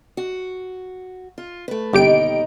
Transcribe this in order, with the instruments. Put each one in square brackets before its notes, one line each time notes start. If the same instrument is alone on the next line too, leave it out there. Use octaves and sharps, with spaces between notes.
[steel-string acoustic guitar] F#4
F4
A3 B4
[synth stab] G1 G4 D7 [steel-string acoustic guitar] D#2 B2 D#4